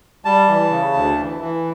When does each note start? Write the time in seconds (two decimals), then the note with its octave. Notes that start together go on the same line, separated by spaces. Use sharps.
0.25 G3 A5
0.47 E3
0.70 C#3
0.94 D2
1.17 E3
1.40 E3